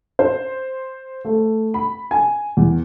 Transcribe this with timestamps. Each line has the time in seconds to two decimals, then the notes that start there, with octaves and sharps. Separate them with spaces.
0.19 C5
1.25 A3
1.74 B5
2.11 G#5
2.57 E2